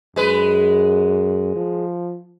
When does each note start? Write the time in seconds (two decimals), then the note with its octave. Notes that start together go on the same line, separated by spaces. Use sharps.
0.16 F#2 G#3 B4
1.56 F3